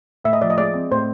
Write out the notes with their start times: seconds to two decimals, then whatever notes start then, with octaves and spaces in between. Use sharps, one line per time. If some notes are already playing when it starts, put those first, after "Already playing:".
0.24 A2 E5
0.33 D#5
0.42 F3 D5
0.50 D#5
0.58 G#3 D5
0.74 C4
0.91 A2 C5